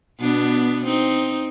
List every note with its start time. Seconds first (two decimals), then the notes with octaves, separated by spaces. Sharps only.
0.20 B2 B3 D4
0.86 C4 D#4